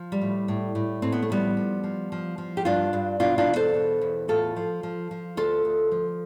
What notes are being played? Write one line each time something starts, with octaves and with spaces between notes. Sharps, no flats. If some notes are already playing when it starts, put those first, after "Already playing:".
Already playing: F3
G3
A2
A2
A2
A2 C4
B3
A3
F3 G3 B3
F3
F3
F3
F3
G4
G2 D4 F4
G2
B2 D4 F4
D4 F4
E2
A4 C5
B2
E2
A2 F4 A4
F3
F3
F3
D2 F4 A4
D2
F3